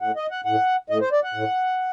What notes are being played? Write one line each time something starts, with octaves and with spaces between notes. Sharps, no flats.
A2 F#5
D#5
F#5
A2 F#5
A2 D#5
C5
D5
F#5
A2